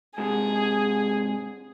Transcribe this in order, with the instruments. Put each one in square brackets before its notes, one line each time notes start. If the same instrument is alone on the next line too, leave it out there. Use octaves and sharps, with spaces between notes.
[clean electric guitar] G#2 C3 G#3 [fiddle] G#4